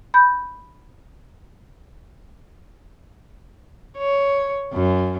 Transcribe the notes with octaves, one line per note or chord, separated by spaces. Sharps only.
B5 G6
C#5
F#2